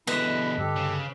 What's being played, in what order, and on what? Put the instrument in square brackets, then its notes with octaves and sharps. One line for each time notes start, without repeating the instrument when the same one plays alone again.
[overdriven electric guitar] B2 D3 [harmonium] E4 [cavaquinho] B4 D#5
[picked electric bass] G2 D3 [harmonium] G4 A4
[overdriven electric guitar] C#3